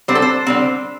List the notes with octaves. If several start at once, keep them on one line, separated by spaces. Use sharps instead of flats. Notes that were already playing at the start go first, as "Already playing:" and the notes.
D3 G3 C4 C5
A4
C5
D3 G3 C4